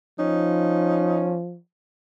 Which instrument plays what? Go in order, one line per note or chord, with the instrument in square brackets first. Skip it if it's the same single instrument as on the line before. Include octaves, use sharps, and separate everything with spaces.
[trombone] F3 [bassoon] C#4 [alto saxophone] D#4